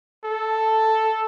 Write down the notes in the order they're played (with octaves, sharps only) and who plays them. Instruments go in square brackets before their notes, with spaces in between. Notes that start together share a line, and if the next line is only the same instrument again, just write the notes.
[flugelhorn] A4